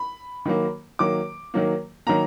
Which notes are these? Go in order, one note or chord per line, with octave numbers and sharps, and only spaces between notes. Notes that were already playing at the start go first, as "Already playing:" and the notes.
Already playing: B5
D#3 F#3 A#3
D#3 F#3 A#3 D6
D#3 F#3 A#3
D#3 F#3 A#3 A#5